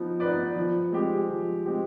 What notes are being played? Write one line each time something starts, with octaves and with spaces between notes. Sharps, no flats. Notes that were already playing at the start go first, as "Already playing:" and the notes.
Already playing: F3 B3 D#4
B3 D#4 B4 D5
F3
G#3 C4 G4
F3
G#3 C4 G4